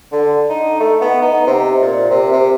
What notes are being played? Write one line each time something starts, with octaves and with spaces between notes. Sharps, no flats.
D3
D#4
A3
B3
D#4
C3
A#2
C3
C3